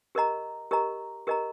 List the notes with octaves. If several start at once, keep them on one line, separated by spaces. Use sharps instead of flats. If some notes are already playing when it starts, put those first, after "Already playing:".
G4 A#4 D#5 A#5
G4 A#4 D#5 A#5
G4 A#4 D#5 A#5